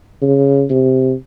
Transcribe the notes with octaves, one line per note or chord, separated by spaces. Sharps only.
C#3
C3